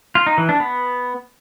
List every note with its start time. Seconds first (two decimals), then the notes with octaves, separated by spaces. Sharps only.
0.15 F4
0.26 D#4
0.38 E3
0.49 D4
0.60 B3